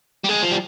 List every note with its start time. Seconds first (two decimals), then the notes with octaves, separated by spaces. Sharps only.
0.25 G3
0.29 G#3
0.43 F3
0.51 G3